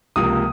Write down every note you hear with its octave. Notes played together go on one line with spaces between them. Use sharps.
C#2 C3 F3 A#3 D#6